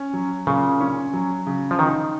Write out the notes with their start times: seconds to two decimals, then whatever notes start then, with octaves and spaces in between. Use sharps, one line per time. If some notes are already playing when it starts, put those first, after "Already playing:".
Already playing: C#4
0.13 F#3
0.47 A#2 C#3
0.80 C#4
1.13 F#3
1.47 C#3
1.71 F3
1.79 D#3 D#4